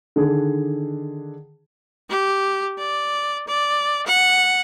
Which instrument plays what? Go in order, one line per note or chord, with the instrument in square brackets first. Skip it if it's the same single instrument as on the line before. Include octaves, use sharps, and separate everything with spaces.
[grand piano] D3 D#3 D4 G#4
[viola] G4
D5
D5
F#5